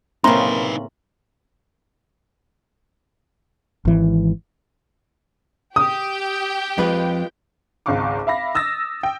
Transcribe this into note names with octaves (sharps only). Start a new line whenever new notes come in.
A2 C#3 A#3 C4 D#4 B4 A#5 C6
G#1 E3
G4 G5 D#6
F2 G#3 F4 B4
G#1 C#2 F5 C#6 D6
E5 F5 B5 A#6
D#6 E6 A6 A#6
G5